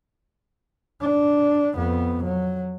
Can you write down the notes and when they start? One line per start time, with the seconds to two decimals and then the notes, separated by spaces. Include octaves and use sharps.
1.01 D4
1.75 F2 B3
2.24 F#3